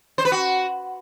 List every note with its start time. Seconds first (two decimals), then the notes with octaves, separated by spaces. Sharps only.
0.18 C5
0.25 B4
0.32 F#4